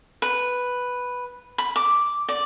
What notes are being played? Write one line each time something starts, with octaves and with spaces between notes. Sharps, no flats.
B4
B5
D6
D5